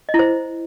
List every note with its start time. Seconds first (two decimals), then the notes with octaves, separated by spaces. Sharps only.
0.09 D#5
0.14 E4
0.19 C5